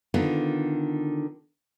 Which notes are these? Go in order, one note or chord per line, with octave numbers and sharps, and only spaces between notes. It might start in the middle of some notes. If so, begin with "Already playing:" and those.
D3 D#3 B3 F4